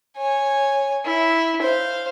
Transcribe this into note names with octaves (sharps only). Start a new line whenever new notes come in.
C#5 G#5
E4
C5 F5